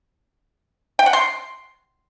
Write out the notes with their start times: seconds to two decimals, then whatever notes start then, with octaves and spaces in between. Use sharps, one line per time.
0.99 G5
1.06 F#5
1.13 C6